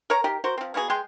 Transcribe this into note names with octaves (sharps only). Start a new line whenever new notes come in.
A#4 C#5 A#5
D#3 G4 A#4
F#4 A#4 C5
F3 C4
A#3 B3 F#4 G#4
G#3 G#4 G5 C6